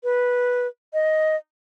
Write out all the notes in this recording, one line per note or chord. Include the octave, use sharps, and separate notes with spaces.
B4
D#5